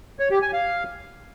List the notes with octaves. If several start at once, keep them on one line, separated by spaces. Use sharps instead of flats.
C#5
G4
G#5
F5